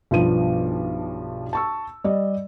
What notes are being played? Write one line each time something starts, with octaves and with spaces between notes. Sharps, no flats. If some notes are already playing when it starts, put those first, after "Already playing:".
B1 G2 F3 B3 D#7
A5 C#6 E6
G3 D5 D#5